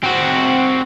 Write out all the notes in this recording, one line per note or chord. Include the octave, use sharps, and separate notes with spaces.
C4 F#4